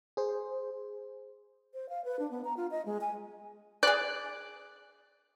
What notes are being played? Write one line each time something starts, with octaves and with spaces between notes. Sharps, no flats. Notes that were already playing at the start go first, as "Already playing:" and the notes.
G#4 C5
C5
F5
B4
D4
B3
A#5
F4
D#5
G#3
G#5
G#4 D5 F#6